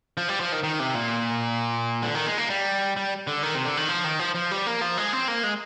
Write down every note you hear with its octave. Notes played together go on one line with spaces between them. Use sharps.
F3
G3
F3
D#3
D#3
C3
A#2
D3
D#3
G#3
A#3
G3
G3
D3
D#3
C3
D3
D#3
F3
D#3
F3
F3
G3
A#3
F3
G#3
C4
A#3
G#3